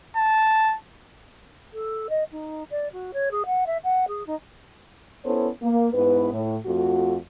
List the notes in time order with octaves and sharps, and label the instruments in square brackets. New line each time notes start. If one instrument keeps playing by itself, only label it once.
[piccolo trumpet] A5
[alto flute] A4
D#5
D#4
D5
F#4
C#5
G#4
F#5
E5
F#5
G#4
D#4
[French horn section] B3 C#4 E4 A4 C5 C#5
A#3
G#2 B3 E4 B4
A2
F2 A3 F4 F#4